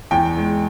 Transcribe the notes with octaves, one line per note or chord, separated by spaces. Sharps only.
E2 G5
G#3